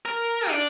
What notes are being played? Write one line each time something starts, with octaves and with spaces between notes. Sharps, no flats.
A#4
D4